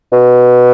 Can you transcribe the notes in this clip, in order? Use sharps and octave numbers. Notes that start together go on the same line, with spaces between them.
B2